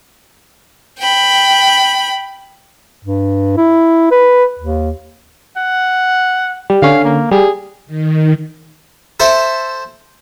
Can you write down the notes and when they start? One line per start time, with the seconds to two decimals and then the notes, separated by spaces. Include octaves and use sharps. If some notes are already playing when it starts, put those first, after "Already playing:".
0.99 G5 B5
3.03 G2
3.57 E4
4.11 B4
4.59 D#2
5.56 F#5
6.70 G3
6.82 D3 C#4 F5
7.04 A#3
7.31 G3 G#4
7.86 D#3
9.20 A4 C5 E5